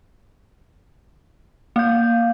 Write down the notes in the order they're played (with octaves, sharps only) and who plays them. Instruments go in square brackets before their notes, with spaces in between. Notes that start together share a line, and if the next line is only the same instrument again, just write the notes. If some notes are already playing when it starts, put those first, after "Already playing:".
[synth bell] A#3 G6 [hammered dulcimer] D5 F5